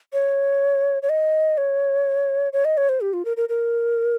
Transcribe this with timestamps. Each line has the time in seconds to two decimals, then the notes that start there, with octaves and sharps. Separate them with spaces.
0.13 C#5
1.03 C#5
1.09 D#5
1.58 C#5
2.53 C#5
2.65 D#5
2.77 C#5
2.89 C5
3.01 G4
3.13 F4
3.25 A#4
3.37 A#4
3.49 A#4